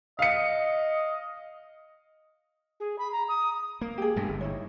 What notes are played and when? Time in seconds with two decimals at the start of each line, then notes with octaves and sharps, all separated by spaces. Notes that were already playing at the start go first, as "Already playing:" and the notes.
0.19 D#5 F5 C#7
2.80 G#4
2.98 B5
3.12 A#5
3.28 D#6
3.81 A#3
3.98 G4 G#4
4.16 G2 B2 G#3
4.29 G1
4.41 D#4 E4 C#5